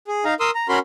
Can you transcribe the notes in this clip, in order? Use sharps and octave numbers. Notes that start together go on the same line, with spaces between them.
G#4
D#4 F5 A#5
A#4 C6 D#6 E6
A#5
C#4 F#4 A#4 B5 C6